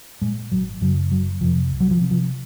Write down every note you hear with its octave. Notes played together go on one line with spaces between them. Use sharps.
A#2 G#3
G#1 F#3
F#2 C#3 F#3
F#1 F#3
F2 C3 F3
C2
F#3
F3
C3
F3